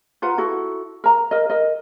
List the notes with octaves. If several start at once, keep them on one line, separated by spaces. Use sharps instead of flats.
F4 B4 F#5 A#5
E4 F#4 A4
A#4 A#5
A#4 D#5
A#4 D#5